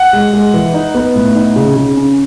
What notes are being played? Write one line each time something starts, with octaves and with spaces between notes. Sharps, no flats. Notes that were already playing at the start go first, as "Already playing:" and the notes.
Already playing: F#5
G#3
G#3
E3
D#4
B3
A2
D#4
C#3
C#3
C#4